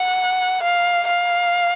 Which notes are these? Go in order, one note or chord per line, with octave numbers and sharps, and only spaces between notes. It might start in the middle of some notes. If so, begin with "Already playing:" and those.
Already playing: F#5
F5
F5